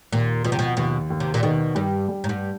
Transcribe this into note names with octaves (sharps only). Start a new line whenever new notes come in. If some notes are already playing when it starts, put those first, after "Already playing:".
D#2 A#2
B2 F3
C3
B2
D#2 B2
D#2
C3
A#2
B2 D#3
G2 G3
G3
G#2
G2